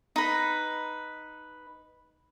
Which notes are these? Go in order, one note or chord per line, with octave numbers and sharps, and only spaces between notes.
D#4 B4